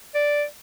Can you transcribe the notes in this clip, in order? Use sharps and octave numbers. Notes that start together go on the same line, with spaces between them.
D5